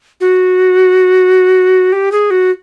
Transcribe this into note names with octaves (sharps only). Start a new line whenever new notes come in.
F#4
G4
G#4
F#4